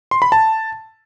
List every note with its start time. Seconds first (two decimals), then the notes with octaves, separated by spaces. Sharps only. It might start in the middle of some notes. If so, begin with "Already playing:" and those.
0.11 C6
0.22 B5
0.32 A5